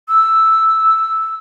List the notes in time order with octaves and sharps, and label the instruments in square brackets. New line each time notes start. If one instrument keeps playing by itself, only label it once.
[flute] E6